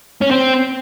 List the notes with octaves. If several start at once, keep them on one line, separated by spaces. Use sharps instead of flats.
C#4
C4